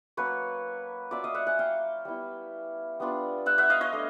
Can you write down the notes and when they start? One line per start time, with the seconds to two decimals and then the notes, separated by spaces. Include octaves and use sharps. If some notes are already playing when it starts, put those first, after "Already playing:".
0.17 F#3 A#3 C#4 B4 C#5
1.11 F#3 A#3 C#4 F4 D5 E5
1.24 D#5 F5
1.34 E5 F#5
1.47 F#5 G#5
1.59 F5 G5
2.05 G3 B3 E4
3.00 G3 B3 D4 F4
3.46 E5 F#5
3.58 E5 F#5
3.70 D#5 F5
3.81 C#5 D#5
3.93 A3 D4